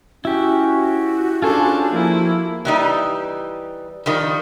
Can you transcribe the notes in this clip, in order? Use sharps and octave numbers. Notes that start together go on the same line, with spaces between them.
C#4 E4 F#4 G4
C#4 D4 F4 G#4 A4 C5
F3 A#3 E4
E3 G3 D#4
D#3 F3 G3